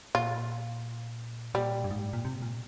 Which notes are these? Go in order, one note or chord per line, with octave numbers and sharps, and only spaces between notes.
A#2 F4
A#2 G3
G2
G#2
A#2
C3
A#2